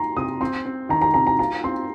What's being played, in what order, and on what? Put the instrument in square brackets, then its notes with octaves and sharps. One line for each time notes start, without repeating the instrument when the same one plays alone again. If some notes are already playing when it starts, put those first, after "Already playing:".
Already playing: [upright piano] A#5 C6
[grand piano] C3 [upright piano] D#6
[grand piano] C4 [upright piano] C6
[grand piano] C4
[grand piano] D#3 [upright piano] A#5
[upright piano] A#5
[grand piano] C3 [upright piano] A#5
[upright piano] A#5
[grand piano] F4 [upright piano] A#5
[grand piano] C4 [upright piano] C6